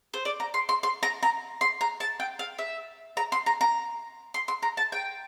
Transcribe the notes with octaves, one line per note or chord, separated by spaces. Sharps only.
C5
D5
A#5
C6
C6
C6
A#5
A#5
C6
A#5
A5
G5
F5
E5
A#5
C6
A#5
A#5
C6
C6
A#5
A5
G5